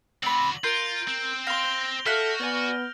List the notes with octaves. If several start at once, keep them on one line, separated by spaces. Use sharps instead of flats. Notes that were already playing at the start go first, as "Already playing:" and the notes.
C4 F#4 D5 B5 F#7
F4 A#4 C6 G6 D7
C4
F5 C6 A#6 F7 G7
F#4 A4 E5 F5 F6 F#6
B3 D5 G#5